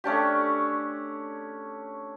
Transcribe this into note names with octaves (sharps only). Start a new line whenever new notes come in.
A3 C#4 D4 G4